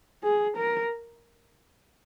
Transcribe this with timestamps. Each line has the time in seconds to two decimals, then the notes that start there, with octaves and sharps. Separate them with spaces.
0.24 G#4
0.57 A#4